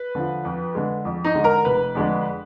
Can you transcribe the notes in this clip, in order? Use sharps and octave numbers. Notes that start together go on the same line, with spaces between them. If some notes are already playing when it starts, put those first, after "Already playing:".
Already playing: B4
D3 F3
F2
D3 G#3
F2
D#4 D#5
D3 G#3
A#4 A#5
F1 B4
F2 D3 G#3 D4